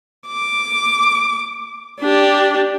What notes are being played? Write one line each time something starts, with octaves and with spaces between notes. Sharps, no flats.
D6
D4 G4